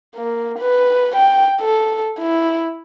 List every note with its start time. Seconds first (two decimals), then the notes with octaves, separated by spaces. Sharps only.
0.16 A#3
0.59 B4
1.16 G5
1.61 A4
2.20 E4